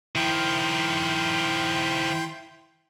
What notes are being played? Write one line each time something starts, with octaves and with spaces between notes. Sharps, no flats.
D#3 F3 E4 G5 C6